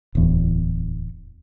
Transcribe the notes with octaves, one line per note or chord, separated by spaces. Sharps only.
D1 E2